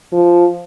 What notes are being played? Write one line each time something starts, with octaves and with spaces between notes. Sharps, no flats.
F3